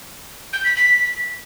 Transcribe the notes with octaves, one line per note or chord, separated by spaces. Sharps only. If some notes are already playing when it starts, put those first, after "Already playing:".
G6
B6
B6